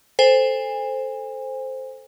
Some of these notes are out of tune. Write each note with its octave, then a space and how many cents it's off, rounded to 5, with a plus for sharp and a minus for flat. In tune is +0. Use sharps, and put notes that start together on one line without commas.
A4 +0 C5 +0 G#5 -30